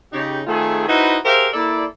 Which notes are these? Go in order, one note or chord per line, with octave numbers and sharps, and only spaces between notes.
C#3 D#4 G4
D#3 A3 C4 F4 G#4
D#4 E4 F#4 B4 C5 D#5
G4 G#4 A#4 C5 E5 F5
A#3 E4 A4 D5